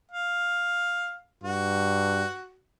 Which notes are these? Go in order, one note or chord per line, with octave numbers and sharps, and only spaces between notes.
F5
G2 F#4